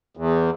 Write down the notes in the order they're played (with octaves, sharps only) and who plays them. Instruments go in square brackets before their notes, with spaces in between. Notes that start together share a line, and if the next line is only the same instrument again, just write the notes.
[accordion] E2